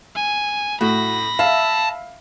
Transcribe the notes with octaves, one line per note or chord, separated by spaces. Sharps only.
G#5
A2 F#4 B5 A#6
E5 F5 A5